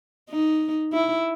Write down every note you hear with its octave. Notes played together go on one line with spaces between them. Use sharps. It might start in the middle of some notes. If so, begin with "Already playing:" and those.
D#4
E4